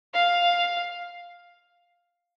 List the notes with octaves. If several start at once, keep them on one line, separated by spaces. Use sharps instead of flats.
F5